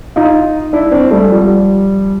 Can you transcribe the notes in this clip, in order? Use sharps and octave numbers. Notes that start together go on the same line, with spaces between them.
D#4 F4
D4 E4
C4 D4
G3 A3
F3 G3